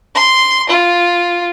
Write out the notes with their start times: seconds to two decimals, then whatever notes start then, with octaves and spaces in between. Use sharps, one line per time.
0.15 C6
0.70 F4